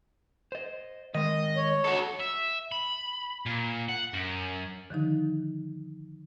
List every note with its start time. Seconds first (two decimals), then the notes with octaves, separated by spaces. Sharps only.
0.52 C5 D#5
1.15 D#3 G#3 D#5
1.56 C#5
1.84 F#4 A4
2.20 E5
2.72 B5
3.46 A#2
3.89 F#5
4.13 F#2
4.90 D3 D#3 F3 D#4